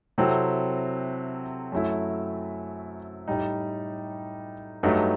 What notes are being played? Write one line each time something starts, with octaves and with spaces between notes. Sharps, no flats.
C3 F#3 C4 E4 A4
F#2 F#3 A3 E4
A2 G3 D#4
G2 F#3 A3 D#4